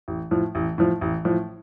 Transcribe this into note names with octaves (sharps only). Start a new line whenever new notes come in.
A1
A2 F3
A1
A2 F3
A1
A2 F3